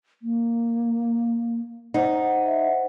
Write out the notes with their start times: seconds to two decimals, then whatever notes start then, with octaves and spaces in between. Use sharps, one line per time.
0.22 A#3
1.94 D#4 C5 F#5
2.46 E5